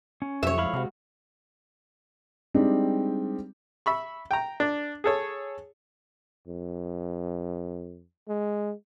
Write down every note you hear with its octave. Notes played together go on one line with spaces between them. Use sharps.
C#4
F2 C3 F#3 G4 C#5 E5
G#2 F3 E4 F5 B5 C#6
C3 G#3 F#4
G3 G#3 C4 D4 D#4 G4
E5 B5 C#6
G5 A#5
D4
G#4 A4 C#5
F2
G#3